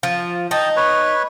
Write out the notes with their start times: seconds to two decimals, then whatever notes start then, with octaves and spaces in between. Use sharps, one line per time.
0.03 F3
0.51 D#4 D#5 G5 A5
0.76 B4 C#5